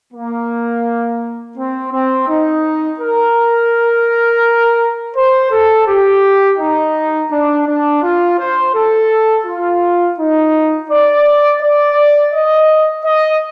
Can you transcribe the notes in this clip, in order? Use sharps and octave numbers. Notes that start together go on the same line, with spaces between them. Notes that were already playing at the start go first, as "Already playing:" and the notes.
A#3
C4
C4
D#4
A#4
C5
A4
G4
D#4
D4
D4
F4
C5
A4
F4
D#4
D5
D5
D#5
D#5